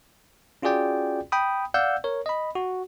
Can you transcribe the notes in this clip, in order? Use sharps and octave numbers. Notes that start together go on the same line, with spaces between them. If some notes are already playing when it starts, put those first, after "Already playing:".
C#4 F4 F#4 G#4 D5 G5
G5 B5 D#6
D5 F5 F#5 E6 G6
A#4 C#5
D#5 B5
F#4